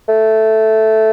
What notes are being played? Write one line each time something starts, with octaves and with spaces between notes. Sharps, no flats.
A3